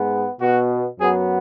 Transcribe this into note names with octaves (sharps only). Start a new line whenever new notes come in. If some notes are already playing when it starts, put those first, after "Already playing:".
Already playing: G#2 G#3 B3
B2 B3 F#4
F#2 F#3 B3 G#4